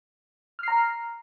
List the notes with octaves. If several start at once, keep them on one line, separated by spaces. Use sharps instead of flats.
A#5 F6 C7